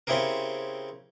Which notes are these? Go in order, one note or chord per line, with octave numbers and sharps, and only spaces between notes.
C#3 C4 E4 G4 G#4 A#4